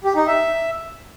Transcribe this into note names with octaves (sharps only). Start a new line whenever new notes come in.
G4
D#4
E5